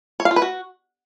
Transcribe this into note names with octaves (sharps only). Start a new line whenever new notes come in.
C#5
F5
F4
B4
F#4